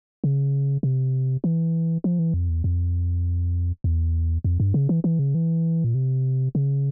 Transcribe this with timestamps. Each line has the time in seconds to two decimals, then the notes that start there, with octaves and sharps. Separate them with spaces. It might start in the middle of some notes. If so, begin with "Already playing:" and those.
0.24 C#3
0.83 C3
1.44 E3
2.04 F3
2.19 E3
2.34 F2
2.49 E2
2.64 F2
3.84 E2
4.44 F2
4.60 G2
4.74 C#3
4.89 E3
5.04 E3
5.19 C#3
5.35 E3
5.84 A#2
5.95 C3
6.55 C#3